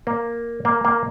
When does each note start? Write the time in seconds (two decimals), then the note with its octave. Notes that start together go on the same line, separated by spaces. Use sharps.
0.07 A#3
0.65 A#3
0.85 A#3